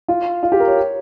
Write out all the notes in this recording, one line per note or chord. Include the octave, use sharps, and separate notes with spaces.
F4
F4
G4
A#4
C#5